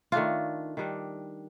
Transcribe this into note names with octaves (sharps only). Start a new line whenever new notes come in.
D#3 A3 D4 F4
D#3 G3 D4